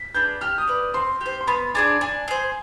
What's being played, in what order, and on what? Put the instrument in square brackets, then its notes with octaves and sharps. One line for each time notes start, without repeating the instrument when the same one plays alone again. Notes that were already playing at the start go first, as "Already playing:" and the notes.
Already playing: [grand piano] B6
[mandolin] D4 G#4 B4 [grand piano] G6
[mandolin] G4 [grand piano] F6
[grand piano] D#6
[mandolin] B4 D5
[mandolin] C4 [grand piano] C6
[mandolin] G4
C5
[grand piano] C6
[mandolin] B3 [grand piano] B5
[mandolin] D4 G#4 D5 [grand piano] G#5
[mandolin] D4 [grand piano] G#5
[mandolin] G#4 C5